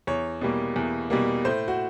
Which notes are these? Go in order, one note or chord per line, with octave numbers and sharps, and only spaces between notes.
E2 C#5
B2 G3 A#3
E2
B2 G3 A#3
A2 C5
F#4